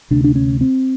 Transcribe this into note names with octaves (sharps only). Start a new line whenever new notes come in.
D2 C3 D4
D4
C#4
C4